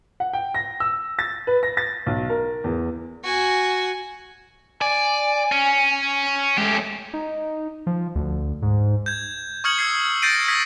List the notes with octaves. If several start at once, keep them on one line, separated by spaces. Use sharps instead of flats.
F#5
G5
A#6
E6
A6
B4
A#6
A6
B1
A#4
E2
F#4 G#5
D5 G#5
C#4
G#3 A3 C#4 G4
D#4
F3
D2
G#2
G6 G#6
C#6 D#6 F6 G#6 C#7 F#7
E6 G#6 C7
G6 A6 A#6 C7 D7 D#7
D#6 G#6 A#6 B6